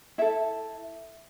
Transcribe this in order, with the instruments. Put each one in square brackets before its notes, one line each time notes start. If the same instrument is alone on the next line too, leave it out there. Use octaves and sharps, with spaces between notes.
[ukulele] E4 A4 E5